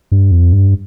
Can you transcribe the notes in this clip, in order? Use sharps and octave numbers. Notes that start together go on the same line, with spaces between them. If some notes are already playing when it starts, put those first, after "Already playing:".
G2
F2
G2